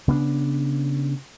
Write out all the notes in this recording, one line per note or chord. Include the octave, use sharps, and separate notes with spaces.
C#3 B3 C#4 D4